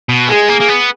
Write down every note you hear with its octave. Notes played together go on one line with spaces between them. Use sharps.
B2
G#3 G#4
A#3
A#3
B3